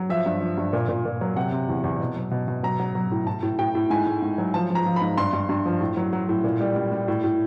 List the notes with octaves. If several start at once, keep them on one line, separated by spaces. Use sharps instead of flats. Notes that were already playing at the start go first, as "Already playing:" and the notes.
Already playing: F#3
F3 E5
G2
F3
G2
A#2
A#2
A#2
F#3
C3 F#5
C3
E2
E2
B2
F#3
B2
B2
F#3 A#5
F#3
F#3
A2
A2 A5
A2
A2 G5
A2
G#2 G#5
G#2
G#2
F#3
F3 A5
F3 A#5
F3
B5
G#2
G2 C6
G2
G2
F3
A2
F#3
F#3
A2
A#2
G3
G3
G3
A2
A2